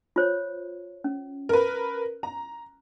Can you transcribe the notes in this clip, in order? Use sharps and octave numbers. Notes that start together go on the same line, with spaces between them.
F4 C5 C#5
C#4
A#4 B4
A#5